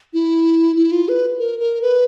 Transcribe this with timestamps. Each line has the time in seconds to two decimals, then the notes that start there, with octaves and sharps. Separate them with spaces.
0.13 E4
0.76 E4
0.92 F4
1.09 B4
1.39 A#4
1.60 A#4
1.82 B4